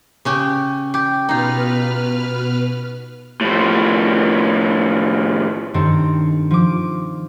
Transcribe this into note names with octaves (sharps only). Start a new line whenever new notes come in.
C#3 C#4 G4
G4
B2 D#4 F4 B4 F6
A2 F3
G2 D#3 C4 A4 C#7
F3 D6